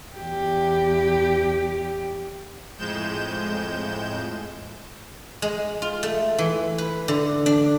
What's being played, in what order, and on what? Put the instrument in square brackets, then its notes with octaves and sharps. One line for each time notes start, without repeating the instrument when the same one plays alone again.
[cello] E2 G4
[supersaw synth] F2 A2 G#3 G6 E7
[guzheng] G#3
F4
A3
E3
B4
D3
D4